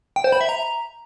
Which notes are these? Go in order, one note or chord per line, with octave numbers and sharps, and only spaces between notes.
G5
C5
B5
E5
A#5